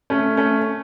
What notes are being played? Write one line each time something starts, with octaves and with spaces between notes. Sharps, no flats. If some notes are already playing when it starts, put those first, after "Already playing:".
A3 C#4
A3 C#4